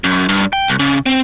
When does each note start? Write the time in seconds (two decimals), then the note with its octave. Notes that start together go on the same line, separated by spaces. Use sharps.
0.04 F#2
0.29 G2
0.53 G5
0.68 C2
0.80 C#3
1.06 C4